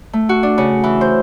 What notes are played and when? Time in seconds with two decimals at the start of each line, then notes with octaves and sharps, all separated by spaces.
0.13 A3
0.29 F#4
0.43 D4
0.58 C#3
0.84 E3
1.01 C5